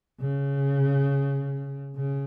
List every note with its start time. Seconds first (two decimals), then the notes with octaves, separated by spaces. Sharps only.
0.20 C#3
1.95 C#3